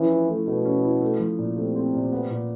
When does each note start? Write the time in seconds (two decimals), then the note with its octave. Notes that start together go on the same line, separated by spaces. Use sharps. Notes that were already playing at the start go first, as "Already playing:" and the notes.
Already playing: E3 F3 C#4
0.09 E4
0.28 A3
0.46 B2 A3
0.65 C#4
0.83 E4
1.02 A3
1.19 F3
1.39 A#2
1.56 C3 A3
1.75 C4
1.93 A#2
2.12 B3
2.30 A#2